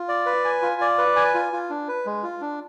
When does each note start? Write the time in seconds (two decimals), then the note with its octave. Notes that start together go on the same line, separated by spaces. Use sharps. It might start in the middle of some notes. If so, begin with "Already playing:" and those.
Already playing: F4
0.08 D5
0.26 B4
0.45 G#5
0.62 F4
0.81 D5
0.98 B4
1.16 G#5
1.35 F4
1.53 F4
1.70 D4
1.88 B4
2.06 G#3
2.23 F4
2.41 D4